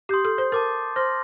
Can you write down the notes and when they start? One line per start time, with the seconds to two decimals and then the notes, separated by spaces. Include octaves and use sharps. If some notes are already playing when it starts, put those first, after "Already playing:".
0.09 G4 C6 D#6 G6 C7
0.25 A4
0.38 C5
0.52 A#4 A5 D6 A6
0.96 C5 C6 F6 A#6